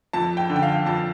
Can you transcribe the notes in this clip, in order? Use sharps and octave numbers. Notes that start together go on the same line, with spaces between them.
F2 A5
G5
D3
G5
F5
F2 A5